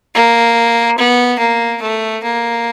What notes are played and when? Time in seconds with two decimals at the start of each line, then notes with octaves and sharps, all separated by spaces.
0.15 A#3
0.98 B3
1.39 A#3
1.82 A3
2.24 A#3